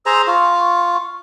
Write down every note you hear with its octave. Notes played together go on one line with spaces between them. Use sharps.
G#4 C5 A#5 E6
F4 C#6